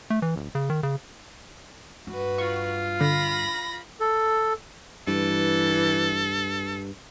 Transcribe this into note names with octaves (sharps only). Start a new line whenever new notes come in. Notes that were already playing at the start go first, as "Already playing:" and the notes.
A3
E3
D1
C#3
D#3
C#3
G2 F#4 B4
F4 C#6
D3 B5 A#6
A4
G2 E3 A4